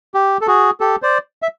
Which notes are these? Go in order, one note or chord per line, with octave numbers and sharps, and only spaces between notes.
G4
A4
F#4 G#4
G4 A4
C5 D5
E5